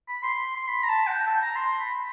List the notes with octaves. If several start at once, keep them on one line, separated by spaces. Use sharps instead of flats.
B5
C6
C6
B5
A#5
A5
F#5
G5
A5
A#5
C6
B5